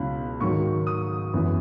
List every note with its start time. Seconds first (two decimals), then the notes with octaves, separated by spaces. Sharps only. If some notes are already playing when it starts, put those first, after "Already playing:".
Already playing: C#2 B2 F#3 C#4 E4 B5
0.41 G#2 D#3 F#3 C#6
0.87 D#6
1.34 F#2 E3 B3 E4